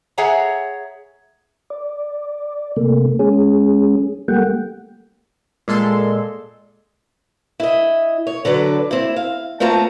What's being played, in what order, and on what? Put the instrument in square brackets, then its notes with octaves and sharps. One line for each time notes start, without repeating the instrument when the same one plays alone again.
[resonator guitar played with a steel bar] G#4 C#5 E5 F#5 G#5 A#5
[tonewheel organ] D5
C3 A3 A#3
G#3 C#4 G#4
G3 A3 A#3 F#5 G5
[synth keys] A#2 G#3 A4 C6
[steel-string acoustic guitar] E4 D#5
C#5
D3 F#3 B4 D5
C4 E4
F5
A3 B3 C4 F4 A5 A#5